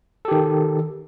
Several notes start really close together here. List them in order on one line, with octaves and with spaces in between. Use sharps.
A4 G4 D#3